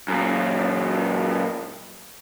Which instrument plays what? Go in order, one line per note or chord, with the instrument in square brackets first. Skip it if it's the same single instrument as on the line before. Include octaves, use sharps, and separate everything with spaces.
[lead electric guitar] F#2 A#2